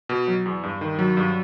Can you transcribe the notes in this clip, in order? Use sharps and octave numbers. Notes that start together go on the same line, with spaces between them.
B2
F#3
E2
G2
D#3
F#3
G2